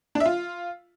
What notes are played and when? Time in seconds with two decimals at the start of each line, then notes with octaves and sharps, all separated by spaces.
0.15 D4
0.20 E5
0.26 F4